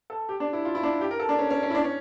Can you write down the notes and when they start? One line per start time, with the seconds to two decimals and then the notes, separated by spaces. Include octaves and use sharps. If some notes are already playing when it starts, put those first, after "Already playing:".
0.10 A4
0.29 G4
0.40 D4
0.53 E4
0.65 F4
0.75 E4
0.83 D4
1.01 G4
1.11 A#4
1.19 A4
1.29 D4
1.39 C#4
1.50 C#4
1.63 C#4
1.70 E4
1.75 D4
1.84 C#4